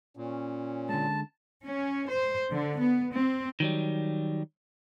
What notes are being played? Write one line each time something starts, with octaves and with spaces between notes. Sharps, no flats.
A#2 C#4
D3 G#3 A5
C#4
C5
D3
B3
C4
D#3 F#3 G3